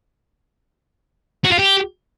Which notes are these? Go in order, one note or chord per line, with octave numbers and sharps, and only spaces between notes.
F#4
F4
G4